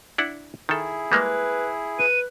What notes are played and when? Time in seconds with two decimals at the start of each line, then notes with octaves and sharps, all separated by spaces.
0.18 D4 E4 F#5
0.69 D#3 E4 G#4 A4
1.12 G3 G#3 A#3 B4
1.99 B4 D#7